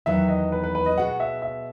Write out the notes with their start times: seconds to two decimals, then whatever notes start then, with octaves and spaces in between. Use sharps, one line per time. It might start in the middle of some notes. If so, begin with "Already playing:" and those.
0.06 E2 D#3 F#3 B3 E5
0.28 D#5
0.52 B4
0.64 B4
0.75 B4
0.86 D#5
0.97 B2 G#3 B3 F#4 F#5
1.20 E5
1.42 E5